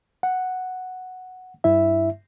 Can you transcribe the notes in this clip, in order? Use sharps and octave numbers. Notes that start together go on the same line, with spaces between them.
F#5
G2 E4 E5